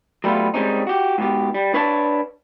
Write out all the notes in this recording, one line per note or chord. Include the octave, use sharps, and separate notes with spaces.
F#3 G3 A3 B3 F4
G3 G#3 A#3 C4 C#4 D#4
F#4 G4
G#2 B2 G4
G3
D4 B4 C#5 D5 F#5 A5